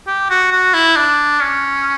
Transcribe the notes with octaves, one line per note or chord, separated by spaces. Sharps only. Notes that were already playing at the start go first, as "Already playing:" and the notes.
G4
F#4
F#4
E4
D4
C#4